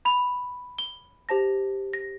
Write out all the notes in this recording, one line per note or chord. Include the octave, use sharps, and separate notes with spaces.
B5 F7
G7
G4 C5 A5 A#6
A#6